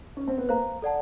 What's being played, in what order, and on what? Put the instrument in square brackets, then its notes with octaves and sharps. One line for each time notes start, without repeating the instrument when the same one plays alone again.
[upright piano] C#4
C4
B3
[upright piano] A#3 [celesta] C5 F5 A#5
[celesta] A4 D5 F#5 A5